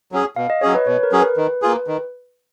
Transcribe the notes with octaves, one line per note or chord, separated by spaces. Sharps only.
F#3 C#4 G#4
B2 F5
D#5
F#3 C#4 G#4 C#5
B4
B2 C#5
A#4
F#3 C#4 G#4
B4
D#3
A#3 F4 G#4
D#3